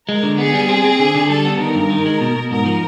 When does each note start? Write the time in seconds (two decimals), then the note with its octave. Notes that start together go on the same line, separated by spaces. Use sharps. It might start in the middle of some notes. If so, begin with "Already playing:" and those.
0.09 G#3 A#4
0.23 D3
0.38 B3 G#4
0.54 G3
0.69 C4
0.84 C4
0.99 D3
1.15 D3
1.30 G3 A4
1.45 B3
1.59 D#3 A#4
1.75 G2
1.90 D#3
2.05 G#3
2.21 B2
2.36 B2
2.51 G#2 A#4
2.66 F3